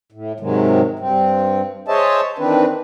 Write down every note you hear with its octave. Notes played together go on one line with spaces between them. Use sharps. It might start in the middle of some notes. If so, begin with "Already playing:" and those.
A2
G#2 C3 D#3 F#3 G#3
G2 C4
G#4 C5 C#5 D#5 E5 A5
D#3 E3 C4 D4 B4